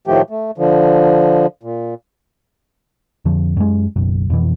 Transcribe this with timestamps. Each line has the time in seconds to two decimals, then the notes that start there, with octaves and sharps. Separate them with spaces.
0.07 A2 D#3 F3 A3 G4
0.30 A3
0.58 D3 F3
1.63 A#2
3.25 F2 D3 F3
3.57 F#2 G#3
3.96 F#1 B1 F#2
4.30 F2 B2 E3